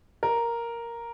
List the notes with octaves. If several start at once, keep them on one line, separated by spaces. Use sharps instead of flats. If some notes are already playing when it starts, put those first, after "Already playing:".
A#4